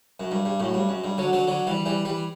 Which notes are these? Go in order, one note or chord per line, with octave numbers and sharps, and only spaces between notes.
F#2
G2
G2
F#2 A2
G2
F#2
G2
D3 F#3
D3 F#3
D3 F#3
E3 G3
E3 G3
E3 G3